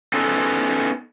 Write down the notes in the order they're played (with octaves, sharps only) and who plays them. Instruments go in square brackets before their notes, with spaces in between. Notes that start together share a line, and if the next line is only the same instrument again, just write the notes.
[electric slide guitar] B3 C#4 D#4 A4 B4 C5